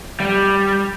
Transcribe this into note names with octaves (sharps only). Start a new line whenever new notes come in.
G3